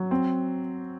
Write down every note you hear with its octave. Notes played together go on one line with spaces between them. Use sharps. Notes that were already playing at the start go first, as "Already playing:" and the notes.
Already playing: F#3
C4